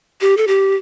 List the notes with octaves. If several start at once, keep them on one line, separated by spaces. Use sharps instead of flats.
G4
A4
G4